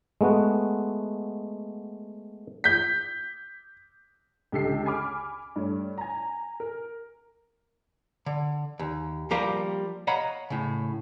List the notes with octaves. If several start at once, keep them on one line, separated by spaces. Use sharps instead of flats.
G#3 A3 B3 F#4 F#5
G6 B6
C#2 D3 G4 A4 C7
G#5 B5 D6 F6
G2 A3 C#5
G#5 A#5
A#4
D3
D#2
F3 G3 A#3 G4 A#4 F5
C#5 D#5 F5 F#5 A#5 B5
A2 C#3